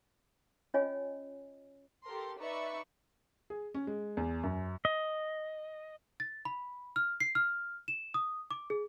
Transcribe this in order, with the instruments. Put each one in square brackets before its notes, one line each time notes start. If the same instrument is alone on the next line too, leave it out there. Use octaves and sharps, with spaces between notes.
[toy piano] C#4 F4 C#5 D#5 G#5
[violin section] G4 A4 A#4 C6
D#4 B4 D5 E5 C#6
[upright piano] G#4
C#4
G#3
E2
F#2
[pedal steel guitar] D#5
[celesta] A6
B5
F6
C7
F6
E7
D#6
D6
G#4